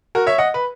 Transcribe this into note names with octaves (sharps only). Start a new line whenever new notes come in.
F#4 A#4
C#5 E5
D#5 F#5
B4